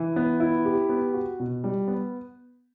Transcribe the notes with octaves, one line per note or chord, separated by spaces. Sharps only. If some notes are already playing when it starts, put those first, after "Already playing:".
Already playing: E3
B3
E4
G4
B3
F#4
B2
G3
B3